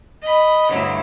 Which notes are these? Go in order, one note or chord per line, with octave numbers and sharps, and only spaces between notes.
D#5 B5
D2 G2 F#3 E4